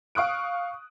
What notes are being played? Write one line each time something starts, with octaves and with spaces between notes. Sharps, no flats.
F5 C#6 D#6 F#6 D7